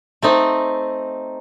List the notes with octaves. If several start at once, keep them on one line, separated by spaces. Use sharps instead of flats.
A3 C4 D#4